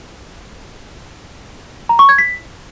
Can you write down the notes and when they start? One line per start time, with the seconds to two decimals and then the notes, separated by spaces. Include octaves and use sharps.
1.89 A#5
1.99 C#6
2.09 G#6
2.18 B6